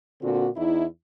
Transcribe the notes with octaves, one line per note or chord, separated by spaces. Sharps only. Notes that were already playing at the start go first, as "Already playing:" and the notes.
A#2 D3 C4 F#4
E2 D#4 E4